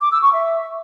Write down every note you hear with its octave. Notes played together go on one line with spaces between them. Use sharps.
D6
E6
C#6
E5